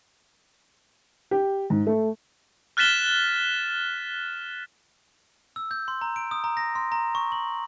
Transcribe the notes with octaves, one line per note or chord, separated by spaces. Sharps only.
G4
G#2
A3
F6 F#6 A6 B6 E7 G7
E6
G6
C6
A#5
D7
D#6
A#5
A#6
C6
A#5
C#6
F#7